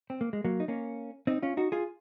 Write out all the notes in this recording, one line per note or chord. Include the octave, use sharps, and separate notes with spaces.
C4
A#3
G#3
F#3 A#3
D#4
A#3 C#4
C4 D#4
C#4 F4
D#4 F#4
F4 G#4